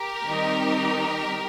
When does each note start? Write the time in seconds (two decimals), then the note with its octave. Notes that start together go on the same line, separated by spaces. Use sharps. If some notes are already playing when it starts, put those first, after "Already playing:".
Already playing: G4 A#4
0.24 D#3 G3 C4 D#4